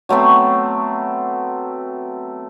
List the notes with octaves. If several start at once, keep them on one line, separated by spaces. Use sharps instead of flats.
F#3 A3 B3 C4